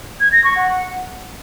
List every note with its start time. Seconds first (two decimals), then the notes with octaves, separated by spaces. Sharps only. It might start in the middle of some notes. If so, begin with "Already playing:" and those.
0.20 G#6
0.32 A#6
0.44 C#6
0.56 F#5